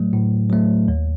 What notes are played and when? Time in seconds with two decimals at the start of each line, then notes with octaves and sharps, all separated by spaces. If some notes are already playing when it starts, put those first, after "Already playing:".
Already playing: A2 F#3 A3
0.13 A2
0.50 F#3 A3
0.88 D#2